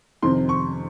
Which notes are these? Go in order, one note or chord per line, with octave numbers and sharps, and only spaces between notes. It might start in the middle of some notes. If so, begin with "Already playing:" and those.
F2 C3 D#3 C6
C#6